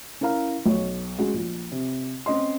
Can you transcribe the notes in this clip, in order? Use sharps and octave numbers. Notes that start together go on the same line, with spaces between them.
C#4 E4 A#4 F5 A#5
B1 C#5
G#3 C#4 F#4
A#1
C3
C4 C#4 D#5 C6